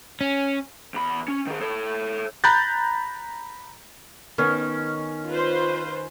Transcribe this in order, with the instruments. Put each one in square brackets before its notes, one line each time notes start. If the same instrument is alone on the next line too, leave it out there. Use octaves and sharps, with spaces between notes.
[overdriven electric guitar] C#4
E2 B5
C#4
D#3 G#4
A4 C#5
[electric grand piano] A#5 B5 F#6 G6 A6
[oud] D#3 B3 [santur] C#4
[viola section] F4 B4 C5